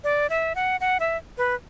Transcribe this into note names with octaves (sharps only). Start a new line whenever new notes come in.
D5
E5
F#5
F#5
E5
B4